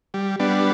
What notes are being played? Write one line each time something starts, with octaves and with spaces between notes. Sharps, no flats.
G3
G3 B3 D4